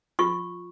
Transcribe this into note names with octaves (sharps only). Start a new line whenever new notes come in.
F4 C#6